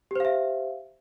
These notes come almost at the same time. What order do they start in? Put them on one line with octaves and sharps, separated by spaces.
G4 C5 F5 E5